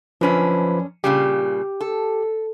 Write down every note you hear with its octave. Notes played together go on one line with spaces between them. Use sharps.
F#2 F3 C#4 D4 B4 B5
A#2 C#3 G3 G4
A4